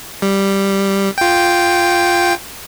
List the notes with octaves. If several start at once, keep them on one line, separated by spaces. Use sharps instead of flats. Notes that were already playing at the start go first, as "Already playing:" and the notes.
G3
F4 G5